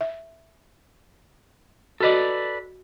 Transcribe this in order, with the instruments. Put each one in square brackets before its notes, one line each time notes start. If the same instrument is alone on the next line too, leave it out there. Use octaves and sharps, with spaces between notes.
[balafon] E5
[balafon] F#4 D#5 [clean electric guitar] A4 B4 D5